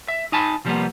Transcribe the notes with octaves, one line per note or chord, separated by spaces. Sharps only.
E5
D#4 G#5 A5 B5
C3 F3 G3 G#3 A#3 B3